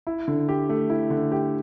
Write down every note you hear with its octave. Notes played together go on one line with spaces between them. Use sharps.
E4
D3
G4
A3
E4
D3
G4